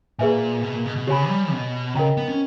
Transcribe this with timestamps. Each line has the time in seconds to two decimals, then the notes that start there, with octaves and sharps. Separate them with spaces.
0.19 A#2 G#4 B4 E5 G#5
0.63 B2
0.74 A#2
0.86 B2
0.96 B2
1.07 C#3 G4 C#5 G#5 B5
1.29 G3
1.52 B2
1.95 C#3 A#4 D#5 G5 A#5
2.17 B3
2.29 C#4